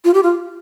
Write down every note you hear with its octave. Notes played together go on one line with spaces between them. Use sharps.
F4
G4
F4